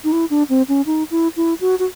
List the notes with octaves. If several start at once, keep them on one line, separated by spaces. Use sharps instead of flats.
D#4
E4
D4
C4
C#4
D#4
E4
E4
F#4
F#4